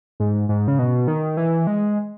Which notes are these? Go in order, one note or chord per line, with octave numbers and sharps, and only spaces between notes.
G#2
G#2
C#3
B2
D#3
E3
G#3